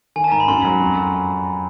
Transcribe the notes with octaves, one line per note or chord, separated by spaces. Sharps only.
D#3 G#5
A5
G#2 A#5
B5
F#2 C6
F#3
F2